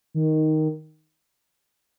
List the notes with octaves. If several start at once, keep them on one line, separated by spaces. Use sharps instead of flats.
D#3